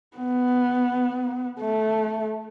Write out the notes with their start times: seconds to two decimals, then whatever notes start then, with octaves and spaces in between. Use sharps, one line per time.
0.17 B3
1.61 A3